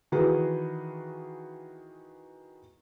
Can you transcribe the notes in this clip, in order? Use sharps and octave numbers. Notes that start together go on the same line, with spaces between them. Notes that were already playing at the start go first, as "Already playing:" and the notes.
D#3 E3 F#4 G#4 B4